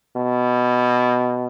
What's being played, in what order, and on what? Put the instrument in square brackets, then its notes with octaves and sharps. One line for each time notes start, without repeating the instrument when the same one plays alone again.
[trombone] B2